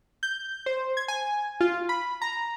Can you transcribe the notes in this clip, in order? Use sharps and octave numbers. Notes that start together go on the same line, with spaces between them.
G6
C5
G#6
G#5
F4
B5
A#5